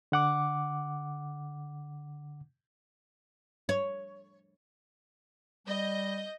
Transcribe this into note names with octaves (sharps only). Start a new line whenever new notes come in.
D3 F#5 D6
C#5
G3 D#5 G6